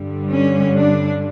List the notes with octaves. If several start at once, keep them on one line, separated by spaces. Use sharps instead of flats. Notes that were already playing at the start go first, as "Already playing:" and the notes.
Already playing: G2 D3 G3
C#4
D4